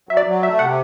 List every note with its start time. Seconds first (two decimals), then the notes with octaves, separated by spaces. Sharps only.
0.09 F#3 E5
0.17 D5
0.26 F#3
0.43 A3 E5
0.59 C3 F#5